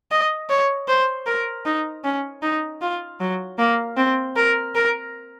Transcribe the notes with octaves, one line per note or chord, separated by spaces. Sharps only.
D#5
C#5
C5
A#4
D#4
C#4
D#4
F4
F#3
A#3
C4
A#4
A#4